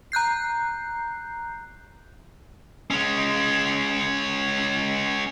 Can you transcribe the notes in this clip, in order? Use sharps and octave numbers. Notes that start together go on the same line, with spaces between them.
A#5 F#6 G6 C7
G#3 C#4